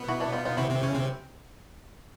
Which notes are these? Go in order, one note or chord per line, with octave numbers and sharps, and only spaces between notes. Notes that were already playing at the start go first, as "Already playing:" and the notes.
Already playing: B2 B3
E4 F#4
D4 E4
D#4 F4
D#4 F4
C3 C4 E4 F#4
C3 C4
C#3 C#4
C3 C4